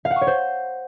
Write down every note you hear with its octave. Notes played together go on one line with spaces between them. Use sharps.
F5
F#5
C#6
C#5
C5